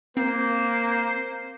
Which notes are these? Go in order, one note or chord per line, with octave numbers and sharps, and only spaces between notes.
A#3 C4 C5